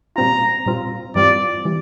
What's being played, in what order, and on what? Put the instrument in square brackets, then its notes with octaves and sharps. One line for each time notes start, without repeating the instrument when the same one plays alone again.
[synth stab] A#2 G3 C4 F4 [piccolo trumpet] A#5
[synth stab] A#2 G3 C4 F4
[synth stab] G2 E3 G3 C4 F4 [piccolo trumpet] D5
[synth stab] E3 G3